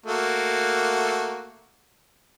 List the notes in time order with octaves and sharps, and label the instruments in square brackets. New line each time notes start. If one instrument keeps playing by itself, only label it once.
[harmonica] A3 A#3 F#4